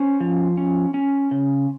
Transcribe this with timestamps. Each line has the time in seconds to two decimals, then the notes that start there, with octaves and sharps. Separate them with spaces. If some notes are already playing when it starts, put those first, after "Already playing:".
Already playing: C#4 C5
0.20 F3
0.57 C#4
0.94 C#4
1.31 C#3